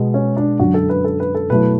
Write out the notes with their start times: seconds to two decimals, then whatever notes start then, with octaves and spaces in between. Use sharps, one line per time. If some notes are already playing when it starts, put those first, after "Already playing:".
Already playing: B2 G#3 B3
0.14 C#4
0.37 D4
0.59 F#2 D3 F#3 F#4
0.74 A4
0.89 B4
1.04 A4
1.20 B4
1.35 A4
1.50 B2 F#3 A3 E4 B4